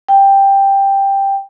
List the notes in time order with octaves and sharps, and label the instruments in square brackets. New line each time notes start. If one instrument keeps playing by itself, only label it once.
[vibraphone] G5